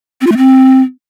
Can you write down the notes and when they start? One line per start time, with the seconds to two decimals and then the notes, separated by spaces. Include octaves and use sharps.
0.21 C4
0.26 F4
0.32 A3
0.37 C4